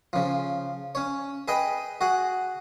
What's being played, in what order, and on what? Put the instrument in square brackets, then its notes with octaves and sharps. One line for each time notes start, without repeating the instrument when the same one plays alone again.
[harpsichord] C#3 F3
C#4 C#5
G#4 B4 D#5 G5
F#4 G#4 F#5